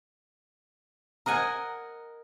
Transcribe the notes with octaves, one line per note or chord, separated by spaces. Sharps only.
A#4 D#5 F#5 G#5